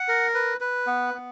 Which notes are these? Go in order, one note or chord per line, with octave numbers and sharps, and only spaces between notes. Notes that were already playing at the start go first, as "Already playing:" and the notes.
Already playing: F#5
A#4
B4
B4
B3
B3